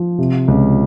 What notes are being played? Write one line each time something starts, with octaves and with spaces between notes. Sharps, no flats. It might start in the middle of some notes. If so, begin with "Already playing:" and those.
Already playing: F3
C3
C#2